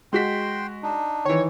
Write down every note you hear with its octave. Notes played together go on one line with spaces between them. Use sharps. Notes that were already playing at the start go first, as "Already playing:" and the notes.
G#3 F#4 G5 C6 B6
D4 D#4
D#3 E3 C#5